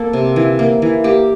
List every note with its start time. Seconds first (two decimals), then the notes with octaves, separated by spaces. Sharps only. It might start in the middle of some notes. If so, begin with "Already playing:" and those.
Already playing: A#3 A4
0.13 C3
0.36 E3
0.59 A#3
0.82 E3
1.04 A#3 G4